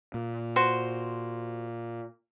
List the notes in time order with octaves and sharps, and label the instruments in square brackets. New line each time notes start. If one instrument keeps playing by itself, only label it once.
[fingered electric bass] A#2
[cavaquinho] F#4 C5